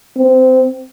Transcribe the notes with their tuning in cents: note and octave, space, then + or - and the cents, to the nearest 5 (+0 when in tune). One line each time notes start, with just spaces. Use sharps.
C4 -20